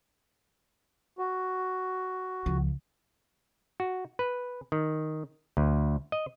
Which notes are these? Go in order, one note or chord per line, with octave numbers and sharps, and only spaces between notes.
F#4
C#2 F3
F#4
B4
D#3
D2
D#5